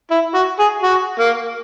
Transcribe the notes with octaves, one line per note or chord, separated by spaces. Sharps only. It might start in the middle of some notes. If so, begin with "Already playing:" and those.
E4
F#4
G#4
F#4
A#3